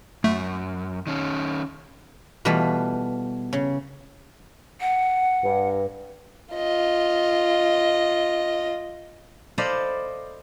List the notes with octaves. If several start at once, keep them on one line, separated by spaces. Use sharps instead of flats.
F#2 A3
D#3 C#4
B2 E3 G3 A3 F4 B4
C#3
F#5
G2
F4 D#5
A4 C5 D5 D#5 F5 B5